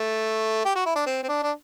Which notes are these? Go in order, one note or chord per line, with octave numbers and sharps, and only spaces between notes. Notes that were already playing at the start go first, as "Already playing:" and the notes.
Already playing: A3
G4
F#4
E4
D4
C4
C4
D4
D4